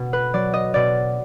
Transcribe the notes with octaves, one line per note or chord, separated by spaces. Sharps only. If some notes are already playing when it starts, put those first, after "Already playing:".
Already playing: B2
B4
F#3 D5
D#5
B2 D5